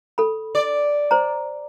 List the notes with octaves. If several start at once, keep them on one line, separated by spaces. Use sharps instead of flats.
A4 B5
D5
C5 A#5